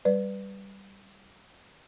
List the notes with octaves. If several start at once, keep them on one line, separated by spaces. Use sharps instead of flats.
G3 B4 D5